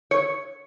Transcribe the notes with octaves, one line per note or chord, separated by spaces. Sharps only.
C#5